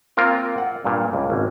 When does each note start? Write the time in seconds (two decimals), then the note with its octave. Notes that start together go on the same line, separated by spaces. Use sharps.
0.17 A#3 C4 F4 A#4
0.58 F#5
0.84 G2 A#2
1.13 C#2
1.30 G#1